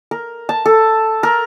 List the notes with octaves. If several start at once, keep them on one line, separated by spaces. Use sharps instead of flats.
A#4
A5
A4
A#4